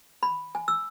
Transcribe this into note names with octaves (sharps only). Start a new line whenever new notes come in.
B5
G#5
E6